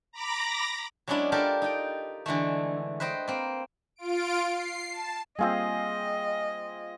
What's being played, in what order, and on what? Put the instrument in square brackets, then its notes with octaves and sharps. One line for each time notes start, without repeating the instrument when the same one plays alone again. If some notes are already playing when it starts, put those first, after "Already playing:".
[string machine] A#5 B5 D6 A#6
[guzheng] F#3 G#3 B3 C#4 D4 E4
D4 F4 G4 A4 A#4
D#4 G5
D3 E3 G#3 A3
B4 C5 D#5 G5
A#3 C4
[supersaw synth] F4 D7
C7
A5
[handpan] G3 A#3 F5 [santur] C4 F4 G#4 [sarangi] D#5